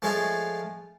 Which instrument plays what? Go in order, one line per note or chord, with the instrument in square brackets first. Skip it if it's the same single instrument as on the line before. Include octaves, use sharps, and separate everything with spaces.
[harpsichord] F3 G#3 A3 F4 C#5